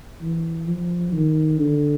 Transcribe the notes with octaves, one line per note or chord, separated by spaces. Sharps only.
E3
F3
D#3
D3